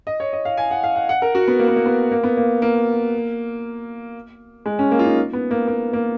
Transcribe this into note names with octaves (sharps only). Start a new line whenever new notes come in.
D#5
C#5
D#5
F5
G#5
F#5
F5
F#5
F#5
A#4
F#4
B3
A#3
B3
A#3
B3
A#3
B3
A#3
A#3
G#3
C#4
A#3
F4
D#4
B3
A#3
A#3
A#3